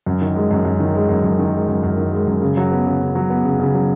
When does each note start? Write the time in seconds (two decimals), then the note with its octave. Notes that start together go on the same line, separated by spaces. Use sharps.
0.06 F#2
0.22 D#3
0.36 G#3
0.51 F#2
0.65 F#2
0.80 D#3
0.95 G#3
1.09 F#2
1.24 F#2
1.39 D#3
1.53 G#3
1.68 F#2
1.83 F#2
1.97 D#3
2.13 G#3
2.27 F#2
2.42 C#3
2.57 F#3
2.72 B3
2.86 C#3
3.01 C#3
3.15 F#3
3.30 B3
3.45 C#3
3.60 C#3
3.74 F#3